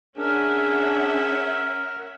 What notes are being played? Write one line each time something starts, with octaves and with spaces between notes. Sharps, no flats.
C#4 D4 G#4 A#4 E5 F#5